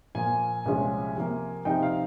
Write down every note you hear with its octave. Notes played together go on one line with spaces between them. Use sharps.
A#2 F3 A#3 G#5
C2 A#2 F3 G#3 C#4
C3 F3 A#3
C3 F3 C4 D#4 G5
F5